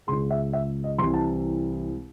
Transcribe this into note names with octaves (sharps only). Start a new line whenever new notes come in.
C#2 C#3 G#3 C6
E5
E5
D#5
C2 C3 E3 C6
A5